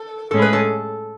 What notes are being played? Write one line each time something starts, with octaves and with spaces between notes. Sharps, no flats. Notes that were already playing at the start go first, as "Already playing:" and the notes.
Already playing: A4
A2 G#3 C#4 G#4 A4
B4
A4